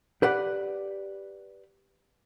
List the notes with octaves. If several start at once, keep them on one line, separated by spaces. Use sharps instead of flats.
G4 B4 D5 F#5